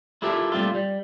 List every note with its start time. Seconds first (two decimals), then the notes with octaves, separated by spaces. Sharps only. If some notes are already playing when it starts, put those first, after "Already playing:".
0.22 E4 F4 G4 A4 A#4 E5
0.52 A#2 G3 A3 C4 F4
0.74 G3